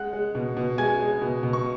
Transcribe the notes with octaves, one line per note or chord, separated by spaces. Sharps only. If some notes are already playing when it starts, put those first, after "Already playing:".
Already playing: G#3 F#5 F#6
G#3
B2
B2
G#3 G#5 G#6
G#3
B2
B2
C#6